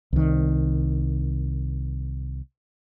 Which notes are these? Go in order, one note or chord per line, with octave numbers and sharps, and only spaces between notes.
C2 D#3